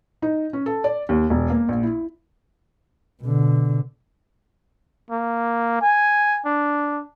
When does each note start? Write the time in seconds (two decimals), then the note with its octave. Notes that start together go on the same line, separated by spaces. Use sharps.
0.22 D#4
0.53 C#4
0.66 A4
0.84 D5
1.09 D#2
1.30 E1
1.50 A#3
1.69 A#1
1.83 E4
3.22 B2 D3
5.11 A#3
5.82 G#5
6.45 D4